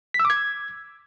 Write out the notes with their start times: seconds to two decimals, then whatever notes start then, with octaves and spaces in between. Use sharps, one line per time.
0.14 B6
0.20 E6
0.25 D6
0.30 G#6